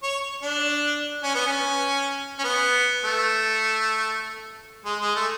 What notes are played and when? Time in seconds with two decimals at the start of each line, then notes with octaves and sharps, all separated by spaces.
0.03 C#5
0.43 D4
1.23 C#4
1.35 B3
1.47 C#4
2.39 C#4
2.44 B3
3.04 A3
4.85 G#3
5.01 G#3
5.16 A3